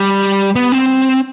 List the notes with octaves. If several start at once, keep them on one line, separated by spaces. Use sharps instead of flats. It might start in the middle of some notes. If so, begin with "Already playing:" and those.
Already playing: G3
B3
C4